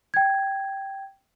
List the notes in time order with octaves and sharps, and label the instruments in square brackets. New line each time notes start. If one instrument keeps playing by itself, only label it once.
[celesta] G5 G#6